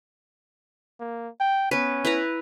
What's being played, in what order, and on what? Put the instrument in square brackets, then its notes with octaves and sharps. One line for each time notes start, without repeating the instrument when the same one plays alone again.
[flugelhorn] A#3
G5
[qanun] B3 B4 [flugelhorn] C#4
[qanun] E4 B4 A#5